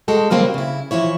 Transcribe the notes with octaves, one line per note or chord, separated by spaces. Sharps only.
G#3 F#4 A4 G5
C#3 F#3 G3 A#3 C4
C#3 E4
E3 F3 E4 C#5